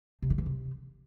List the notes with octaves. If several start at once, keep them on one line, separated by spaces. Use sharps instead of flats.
C3
D#3
E3
C3